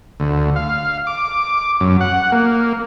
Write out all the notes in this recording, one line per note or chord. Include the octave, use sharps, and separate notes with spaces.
D2
F5
D6
F#2
F#5
A#3